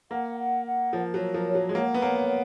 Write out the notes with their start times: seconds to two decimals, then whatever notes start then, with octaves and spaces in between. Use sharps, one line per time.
0.11 A#3 F#5
0.39 F#5
0.66 F#5
0.93 F3 A#4
1.14 F#3
1.21 A#4
1.34 F3
1.48 C#5
1.55 F#3
1.69 G#3
1.75 A#3 F#5
1.94 B3
2.02 A#3 C#5